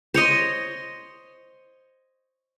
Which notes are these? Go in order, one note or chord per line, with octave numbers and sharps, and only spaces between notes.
C5 C#5 D#5 C6